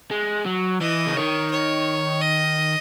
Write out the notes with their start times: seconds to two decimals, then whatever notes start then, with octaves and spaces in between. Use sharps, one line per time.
0.11 G#3
0.46 F#3
0.81 E3 D#5
1.07 C#3
1.16 D#3 C#5
1.51 C#5
2.21 D#5